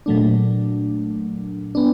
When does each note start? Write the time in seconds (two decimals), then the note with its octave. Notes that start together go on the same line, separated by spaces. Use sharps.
0.06 A#2 F#3 A3 D4
1.75 B3 D4